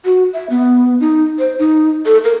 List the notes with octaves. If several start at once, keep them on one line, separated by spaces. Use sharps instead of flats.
F#4
E5
B3
D#4
C5
D#4
A4
A#4